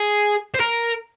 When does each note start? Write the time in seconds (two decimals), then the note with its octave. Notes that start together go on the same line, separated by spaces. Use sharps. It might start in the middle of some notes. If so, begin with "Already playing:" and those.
Already playing: G#4
0.54 C5
0.60 A#4